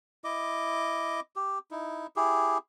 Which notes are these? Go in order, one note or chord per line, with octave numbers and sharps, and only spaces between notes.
E4 D#5 D6
G4
D#4 E4
E4 G4 G#4